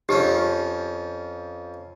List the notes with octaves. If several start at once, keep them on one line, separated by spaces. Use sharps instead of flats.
F2 F3 C#4 G4